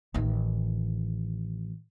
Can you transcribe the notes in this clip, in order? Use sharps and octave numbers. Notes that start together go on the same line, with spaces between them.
A1 D#3